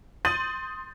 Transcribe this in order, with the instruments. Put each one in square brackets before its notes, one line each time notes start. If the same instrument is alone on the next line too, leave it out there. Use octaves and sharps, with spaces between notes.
[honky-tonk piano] C6 D#6 G6 A6 D#7 F#7